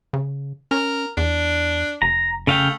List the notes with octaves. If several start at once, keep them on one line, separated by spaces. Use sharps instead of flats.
C#3
C#4 A#4
E2 D4
F1 A#5
C#3 A3 F5 G5